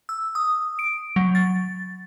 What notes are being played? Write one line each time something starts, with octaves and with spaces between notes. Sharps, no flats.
E6
D#6
D7
F#3
A6